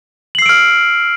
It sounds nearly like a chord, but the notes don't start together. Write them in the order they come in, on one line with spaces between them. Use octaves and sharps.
F#7 C7 E6 D7 F6